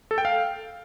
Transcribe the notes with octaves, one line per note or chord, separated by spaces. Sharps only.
A4
G5
F5